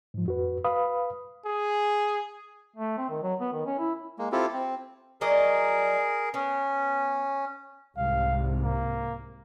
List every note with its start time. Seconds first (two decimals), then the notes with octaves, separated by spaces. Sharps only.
0.14 G#2 F3
0.26 F2 F#4 B4
0.64 B4 F5 B5 D#6
1.45 G#4
2.76 A3
2.98 C4
3.10 D#3
3.22 F#3
3.40 B3
3.53 D#3
3.66 C#4
3.79 E4
4.19 G#3 A#3
4.32 C4 E4 F4 G4 A4
4.53 C4
5.21 F#3 G#4 A#4 D5 D#5
6.34 B3 C#4
7.98 C2 G#2 C3 F5
8.63 A#3